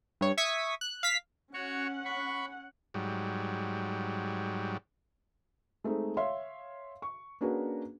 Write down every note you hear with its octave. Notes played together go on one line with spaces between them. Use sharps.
G2 C#5
E5 C#6 D#6 G#6 B6
F#6
F5 B6
C#4 F#4 C#5 F#5 C#6
B5 C#6
G#2 F#3 G3
G#3 A3 C4 D#4
C#5 E5 F5 C6
C#6
A#3 C#4 D4 F#4 G#4 B4